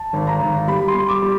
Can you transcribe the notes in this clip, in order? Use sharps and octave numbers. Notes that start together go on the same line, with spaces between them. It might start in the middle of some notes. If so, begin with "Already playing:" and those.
Already playing: A5
G#1
A#5
G#1
G3 B5
C6
G3
D6
G3